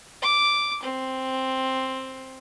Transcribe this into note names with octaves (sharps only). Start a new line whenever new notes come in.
D6
C4